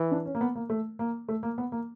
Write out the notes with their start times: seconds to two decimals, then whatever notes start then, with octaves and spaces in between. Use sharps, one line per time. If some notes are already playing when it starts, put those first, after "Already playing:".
Already playing: E3
0.12 D4
0.26 C#4
0.35 A#3
0.41 B3
0.55 A#3
0.70 A3
0.99 A#3
1.28 A3
1.43 A#3
1.58 B3
1.72 A#3